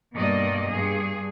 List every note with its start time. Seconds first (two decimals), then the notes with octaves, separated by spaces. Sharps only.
0.15 G2 B2 A#3 D5 D#5
0.70 G2 G#4